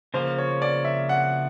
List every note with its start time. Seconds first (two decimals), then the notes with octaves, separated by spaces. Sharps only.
0.14 C#3 F3 A#3 C5
0.38 C#5
0.62 D5
0.85 E5
1.09 F#5